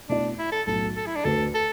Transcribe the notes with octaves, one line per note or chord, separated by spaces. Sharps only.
B2 A3 D4 E4 D5
E4
A4
B1 A2 F#3 A4
A4
E4
D4
D2 D3 A3 F#4 A4 B4
A4